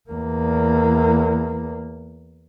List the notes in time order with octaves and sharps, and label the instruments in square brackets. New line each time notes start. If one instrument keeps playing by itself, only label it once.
[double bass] E2 A#3